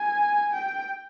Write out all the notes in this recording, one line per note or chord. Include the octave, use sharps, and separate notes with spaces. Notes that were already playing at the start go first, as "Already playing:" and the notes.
Already playing: G#5
G5